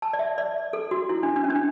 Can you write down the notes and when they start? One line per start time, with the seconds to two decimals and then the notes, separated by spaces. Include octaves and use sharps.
0.02 A5
0.13 D5
0.19 E5
0.38 D5
0.73 A4
0.91 F#4
1.09 E4
1.23 D4
1.36 D4
1.44 C#4
1.50 D4